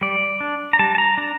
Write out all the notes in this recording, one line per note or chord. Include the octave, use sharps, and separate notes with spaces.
G3 D5
D4
A#5
G3 A5
A5
A#5
D4 A#5